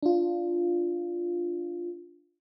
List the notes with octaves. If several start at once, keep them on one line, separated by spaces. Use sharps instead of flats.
D4 F4